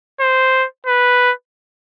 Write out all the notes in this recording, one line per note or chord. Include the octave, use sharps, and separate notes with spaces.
C5
B4